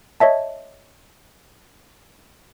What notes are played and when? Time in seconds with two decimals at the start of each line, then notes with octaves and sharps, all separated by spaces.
0.20 C#5 D#5 E5 A5